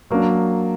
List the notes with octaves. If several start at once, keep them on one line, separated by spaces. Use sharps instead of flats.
F#3 A#3 D4